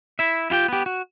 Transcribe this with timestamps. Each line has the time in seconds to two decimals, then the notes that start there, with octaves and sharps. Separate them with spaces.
0.19 E4 E5
0.50 E4 F4 G4 G5
0.68 B3 G4
0.86 F#4